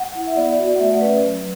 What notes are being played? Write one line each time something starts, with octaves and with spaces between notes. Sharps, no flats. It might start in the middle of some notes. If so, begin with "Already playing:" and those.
Already playing: F#5
E4
E5
B3 D5
F#4
F#5
A3 E5
D5
C#4 B4
F#3